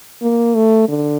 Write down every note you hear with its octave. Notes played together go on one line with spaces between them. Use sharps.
A#3
A3
D3